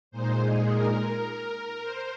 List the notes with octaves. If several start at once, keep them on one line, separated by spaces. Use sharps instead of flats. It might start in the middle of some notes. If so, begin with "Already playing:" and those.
A#2 G#3 D#4 C5
G#4
A#4
C5